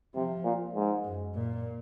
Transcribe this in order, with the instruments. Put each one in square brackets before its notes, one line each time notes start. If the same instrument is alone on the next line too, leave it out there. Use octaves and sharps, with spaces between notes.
[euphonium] C3 [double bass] F3
[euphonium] A#2
G#2
[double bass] F#2
A#2